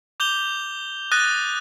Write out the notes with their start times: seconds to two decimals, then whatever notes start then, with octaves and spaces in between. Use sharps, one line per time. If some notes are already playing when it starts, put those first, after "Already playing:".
0.20 D6 G6 F7 G7
1.12 D#6 F#6 A6 A#6 D#7